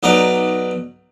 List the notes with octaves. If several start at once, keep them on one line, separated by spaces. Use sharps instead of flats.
B1 F#3 D#4 D5 D#5 A#5